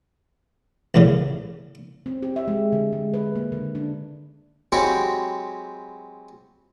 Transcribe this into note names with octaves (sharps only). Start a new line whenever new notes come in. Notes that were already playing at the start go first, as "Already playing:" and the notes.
A1 F#2 A#2 C#3
C4
G4
E5
G#3
D3
G#3
B4
A#3
D3
D4
F#3 G#3 C4 E4 F#4 G4